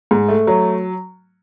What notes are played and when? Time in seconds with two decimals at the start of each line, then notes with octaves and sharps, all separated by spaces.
0.11 G#2
0.29 A3
0.47 F#3